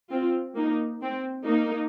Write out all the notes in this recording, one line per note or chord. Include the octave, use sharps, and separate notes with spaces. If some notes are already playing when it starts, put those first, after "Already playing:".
C4 F4
A#3 D#4
C4
A#3 D#4